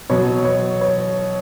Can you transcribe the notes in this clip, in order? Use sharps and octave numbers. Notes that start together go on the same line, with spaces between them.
B2 F#3 C#5
C#5
C#5